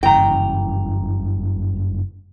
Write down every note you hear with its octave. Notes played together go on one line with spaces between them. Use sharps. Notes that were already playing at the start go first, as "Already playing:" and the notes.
F#1 G2 C#3 E3 G5 A#5